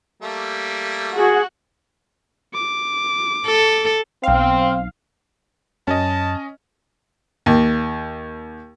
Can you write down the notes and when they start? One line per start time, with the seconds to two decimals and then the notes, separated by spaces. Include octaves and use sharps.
0.23 G3 A3 A#3
1.16 F#4 G#4
2.54 D6
3.46 A4
4.23 B1 C4 F5
5.87 F#2 C#4 D#5 A5
7.46 D#2